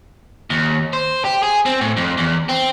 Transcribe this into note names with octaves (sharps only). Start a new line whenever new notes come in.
D#2
C5
G4
G#4
C4
A2
F2
E2
C4